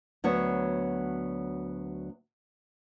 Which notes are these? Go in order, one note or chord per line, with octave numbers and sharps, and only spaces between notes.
D2 F#3 B3 C#5 F#5